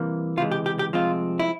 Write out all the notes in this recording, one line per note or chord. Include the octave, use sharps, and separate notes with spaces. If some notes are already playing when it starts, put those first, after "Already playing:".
Already playing: C2 C3 E3 A#3
C#2 C3 E3 G#3 F4
G4
G4
G4
C2 C3 F3 G#3 C4 F4
E4